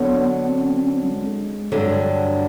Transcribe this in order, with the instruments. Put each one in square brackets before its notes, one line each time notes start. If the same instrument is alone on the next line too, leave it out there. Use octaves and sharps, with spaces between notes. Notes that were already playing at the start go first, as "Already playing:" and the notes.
Already playing: [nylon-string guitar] D3 F#3 [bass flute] B3
[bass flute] C4
C#4
C4
C#4
C4
G3
G#3
[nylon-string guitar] G2 D3 F#3 A3 D4